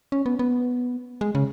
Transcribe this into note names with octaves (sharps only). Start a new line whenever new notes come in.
C#4
B3
B3
G#3
C#3